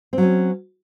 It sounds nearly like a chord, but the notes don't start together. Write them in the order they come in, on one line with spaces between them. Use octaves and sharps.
C4 F#3 C#4